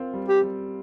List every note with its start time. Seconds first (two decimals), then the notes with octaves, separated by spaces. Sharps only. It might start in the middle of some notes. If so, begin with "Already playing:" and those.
Already playing: C4 F4 A#4
0.14 G3
0.28 G4
0.42 G3